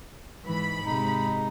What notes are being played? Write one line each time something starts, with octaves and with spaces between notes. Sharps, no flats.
G#2 E3 B5
C3 G#3 D#4